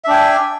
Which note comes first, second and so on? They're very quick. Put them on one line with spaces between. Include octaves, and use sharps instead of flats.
E5 D4 G5 G#5